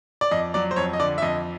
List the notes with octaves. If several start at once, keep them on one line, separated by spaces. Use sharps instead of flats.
D5
F2 D#5
F#3 D5
C5
F2 C#5
D#5
D3 D5
E5
F2 D#5